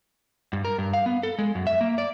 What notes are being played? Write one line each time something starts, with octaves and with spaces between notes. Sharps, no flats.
G2
A#4
G2
F5
B3
A4
G#3
F#2
E5
A#3
D5